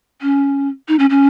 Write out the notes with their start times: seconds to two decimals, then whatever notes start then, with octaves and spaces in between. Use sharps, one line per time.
0.22 C#4
0.88 D#4
0.99 C#4
1.10 C#4